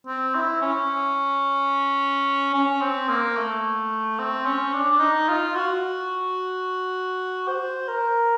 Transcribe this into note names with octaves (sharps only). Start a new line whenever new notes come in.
C4
E4
C#4
C#4
C4
A#3
A3
C4
C#4
D4
D4
D#4
F4
F#4
C5
A#4